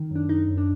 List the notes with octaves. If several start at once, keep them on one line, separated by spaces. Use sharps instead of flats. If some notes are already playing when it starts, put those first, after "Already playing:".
Already playing: D#3
F#2 D4
F#2 D#4
F#2
D4